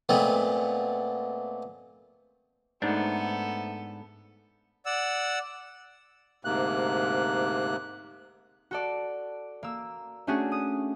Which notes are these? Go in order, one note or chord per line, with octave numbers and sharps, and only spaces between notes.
A#2 G#3 A3 B3 C4
G#2 A3 B3 D4 D#4 A4 C5
D5 F#5 E6
D2 G#2 C3 A#3 F#6
F#4 A4 D5
A#3 E6
A3 C#4 D4 F#4 G#4
D#6